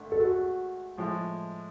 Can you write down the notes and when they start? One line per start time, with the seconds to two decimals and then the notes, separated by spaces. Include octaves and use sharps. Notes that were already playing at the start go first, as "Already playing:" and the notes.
Already playing: G#1 D3 A3
0.12 A4
0.20 F#4 G#4
0.98 A2 F3 G#3